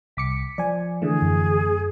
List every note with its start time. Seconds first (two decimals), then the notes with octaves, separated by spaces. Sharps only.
0.17 C2 D6 B6 C#7
0.58 F3 D5 G#5
1.02 D3 E3 A3 G#4
1.22 F#2